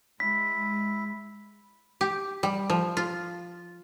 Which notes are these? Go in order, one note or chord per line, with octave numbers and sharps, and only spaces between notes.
G#3 E4 B6
G4
G3
F3
F4